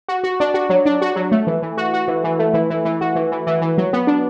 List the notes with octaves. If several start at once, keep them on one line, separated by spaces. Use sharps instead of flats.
F#4
F#4
D4
F#4
F#3
D4
F#4
F#3
A3
E3
E3
F#4
F#4
E3
E3
A3
E3
E3
E3
F#4
E3
E3
E3
E3
F#3
B3
D4